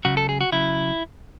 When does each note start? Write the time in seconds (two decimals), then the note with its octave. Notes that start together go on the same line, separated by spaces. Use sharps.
0.05 C#2 C#3 F#3 F#4
0.17 A4
0.29 G#4
0.41 F#4
0.52 C#3 F#3 E4